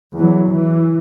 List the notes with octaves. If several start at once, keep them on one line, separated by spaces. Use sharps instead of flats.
E2 E3 F#3
E3